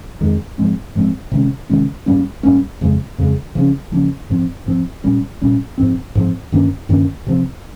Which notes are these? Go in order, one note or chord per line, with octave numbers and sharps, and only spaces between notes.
F2 D#3 G#3
G#2 F3 G#3 C4
G#2 F3 G#3 C4
C3 D#3 G#3 C#4
C3 D#3 G#3 C#4
G#2 G3 A#3 C#4
G#2 G3 A#3 C#4
F2 C#3 G#3
F2 C#3 G#3
C#3 F3 A#3 C#4
C#3 F3 A#3 C#4
G#2 F3 C4
G#2 F3 C4
A#2 G3 C#4
A#2 G3 C#4
G#2 F3 C4
G#2 F3 C4
G2 D#3 A#3 C#4
G2 D#3 A#3 C#4
C3 F3 C4